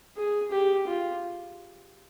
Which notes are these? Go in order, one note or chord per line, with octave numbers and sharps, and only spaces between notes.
G#4
G4
F4